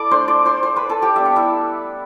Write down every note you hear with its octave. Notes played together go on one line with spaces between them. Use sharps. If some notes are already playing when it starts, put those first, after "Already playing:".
Already playing: E4 A4 D5 D6
A3 D4 C5 C6
D5 D6
C5 C6
C5 C6
B4 B5
A4 A5
G4 G5
G3 B3 D4 E5
F#5
E4 E5